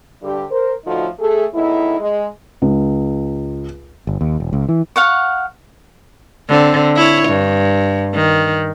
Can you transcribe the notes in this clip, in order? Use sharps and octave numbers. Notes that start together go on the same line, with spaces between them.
G2 D3 G4
A#4 C5
A2 D3 F3 D#4 F4 F#4
A3 G#4 A4
E2 A2 D#4 E4
G#3
C#2
G1
D#2
E1
C#2
E3
F5 F#5 C#6
D3 C4
E4 C#5
G2
D#3